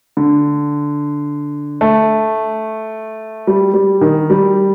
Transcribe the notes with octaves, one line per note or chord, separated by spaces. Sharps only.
D3
A3
G3
G3
D#3
G3